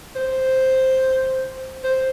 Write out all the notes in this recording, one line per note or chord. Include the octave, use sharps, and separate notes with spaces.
C5
C5